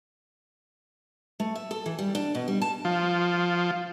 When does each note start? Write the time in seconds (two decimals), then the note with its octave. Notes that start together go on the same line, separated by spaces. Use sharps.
1.40 A3
1.55 E5
1.71 A4
1.86 E3
1.99 G3
2.15 D4
2.35 B2
2.48 G3
2.62 A5
2.85 F3